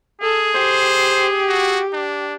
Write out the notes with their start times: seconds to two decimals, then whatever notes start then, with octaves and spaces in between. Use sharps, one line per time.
0.22 G#4 A4
0.55 G4 C5
1.48 F#4
1.93 D4